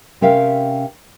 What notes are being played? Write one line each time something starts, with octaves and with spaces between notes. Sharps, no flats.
C3 C#4 A#4 E5 F5 G5